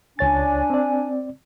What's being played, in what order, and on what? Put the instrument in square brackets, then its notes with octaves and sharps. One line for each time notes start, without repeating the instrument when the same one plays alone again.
[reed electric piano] C#2 C#5 A6 [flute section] D4 G#5
[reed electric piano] C4 D5